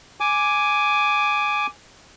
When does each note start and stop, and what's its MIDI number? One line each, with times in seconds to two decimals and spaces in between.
0.20 1.67 80
0.20 1.67 86